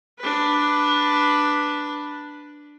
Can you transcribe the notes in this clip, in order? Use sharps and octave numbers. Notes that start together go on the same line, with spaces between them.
D4 B4